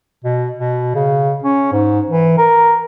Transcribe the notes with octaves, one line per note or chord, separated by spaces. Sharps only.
B2
B2
C#3
C#4
G#2
E3
A#4